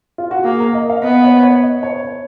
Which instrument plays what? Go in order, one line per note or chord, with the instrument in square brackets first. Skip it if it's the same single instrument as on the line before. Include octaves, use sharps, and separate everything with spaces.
[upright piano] F4
F#4
[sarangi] A#3 [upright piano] G#4
[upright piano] A#4
D#5
F5
[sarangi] B3 [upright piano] D#5
[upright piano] C#5
C#5
D#5
C#5
C#5